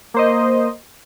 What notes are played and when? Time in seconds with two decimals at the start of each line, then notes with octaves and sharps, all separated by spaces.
0.14 A#3 C5 D#5